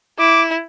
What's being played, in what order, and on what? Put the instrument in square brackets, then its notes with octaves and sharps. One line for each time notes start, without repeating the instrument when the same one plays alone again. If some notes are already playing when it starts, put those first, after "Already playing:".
[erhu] E4 [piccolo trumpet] D6